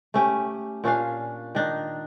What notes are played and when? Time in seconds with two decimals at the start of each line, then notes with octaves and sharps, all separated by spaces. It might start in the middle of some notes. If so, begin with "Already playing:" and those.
0.14 A3 C#4 G4
0.84 A#2 C#4 D4 F5
1.55 D#3 D4 D#4